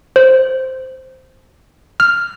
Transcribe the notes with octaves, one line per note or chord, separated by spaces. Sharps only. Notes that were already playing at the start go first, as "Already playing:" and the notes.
C5
F6